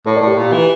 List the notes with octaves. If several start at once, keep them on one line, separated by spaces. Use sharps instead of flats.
A2 A4 C#5
A2 A#4 D5
G4
A#2
E3